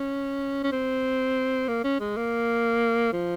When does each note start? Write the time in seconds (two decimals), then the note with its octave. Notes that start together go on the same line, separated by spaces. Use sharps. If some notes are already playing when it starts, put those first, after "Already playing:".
Already playing: C#4
0.63 C#4
0.72 C4
1.68 A#3
1.84 C#4
2.00 G#3
2.17 A#3
3.13 F3